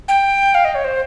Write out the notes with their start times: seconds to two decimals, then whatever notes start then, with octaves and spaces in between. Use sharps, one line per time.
0.08 G5
0.54 F5
0.65 D#5
0.75 C#5
0.84 C5